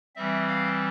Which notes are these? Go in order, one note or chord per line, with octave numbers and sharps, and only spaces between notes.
E3 G3 C4 E5
F5